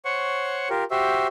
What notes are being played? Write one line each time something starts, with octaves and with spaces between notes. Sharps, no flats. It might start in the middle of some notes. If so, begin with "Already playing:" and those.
C5 C#5 F#5 C#6
F4 G4 A#4
F#4 G4 C5 E5